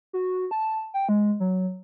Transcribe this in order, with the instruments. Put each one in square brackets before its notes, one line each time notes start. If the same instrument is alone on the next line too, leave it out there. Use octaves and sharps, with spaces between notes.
[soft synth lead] F#4
A5
G5
G#3
F#3